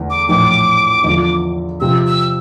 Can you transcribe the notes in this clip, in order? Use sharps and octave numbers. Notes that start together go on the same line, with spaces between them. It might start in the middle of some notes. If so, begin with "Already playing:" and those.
Already playing: E2 D3 A3
D6
A#1 A2 E3 D6
E2 D3 F3
C3 F3 C4 E6
E6